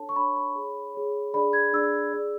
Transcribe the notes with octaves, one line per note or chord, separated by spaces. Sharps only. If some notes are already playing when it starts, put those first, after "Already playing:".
Already playing: D4 A4 C#5 A5
C#6
D4 A4 C#5 B5
B5
G#4 C#5
G#4 C#5
D4 G#4 D5 B5
G#6
D4 G#4 D5 E6
G#4 D5